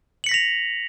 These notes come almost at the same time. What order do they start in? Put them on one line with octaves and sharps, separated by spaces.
F#7 C#7 B6 A#6 F7